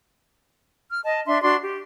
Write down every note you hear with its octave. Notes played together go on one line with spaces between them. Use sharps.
F6
D#5 A5
D4 E5 C6
D4 F#4 C6
G4